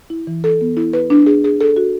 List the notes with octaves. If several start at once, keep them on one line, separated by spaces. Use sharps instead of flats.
E4
E3
A4
B3
E4
B4
D4
G#4
G#4
A4
F#4